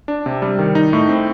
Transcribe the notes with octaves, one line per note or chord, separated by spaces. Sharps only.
D4
C3
G3
D#3
D#4
A2
C4